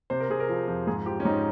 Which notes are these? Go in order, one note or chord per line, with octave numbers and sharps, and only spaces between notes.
C3 C5
A#4
C3 G#4
A#4
F3
F2
G#2 G#4
F3 G4
C#4
G#2 D#4